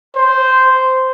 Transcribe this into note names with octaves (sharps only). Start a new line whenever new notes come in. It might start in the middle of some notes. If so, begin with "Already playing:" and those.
C5